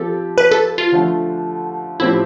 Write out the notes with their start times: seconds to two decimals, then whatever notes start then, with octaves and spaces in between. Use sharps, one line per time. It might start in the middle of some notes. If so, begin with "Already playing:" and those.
Already playing: F3 C4 G4 A4
0.38 B4
0.51 A4
0.78 F4
0.92 D3 F3 A3
2.00 A2 F3 C4 E4 G4 C5